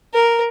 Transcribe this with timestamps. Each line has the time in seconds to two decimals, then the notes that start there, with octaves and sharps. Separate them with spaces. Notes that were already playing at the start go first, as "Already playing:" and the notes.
0.14 A#4